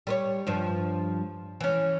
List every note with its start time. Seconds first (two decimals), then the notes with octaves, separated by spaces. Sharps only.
0.07 G3 B4 C#5
0.47 G2 F3
1.61 E3 C#4